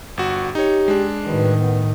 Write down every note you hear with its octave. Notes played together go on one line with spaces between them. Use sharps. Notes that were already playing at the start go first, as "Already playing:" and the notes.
G1 F#4
D#4 G4 C#5
G#3 D4
A2 D#3 F#3 B4
B3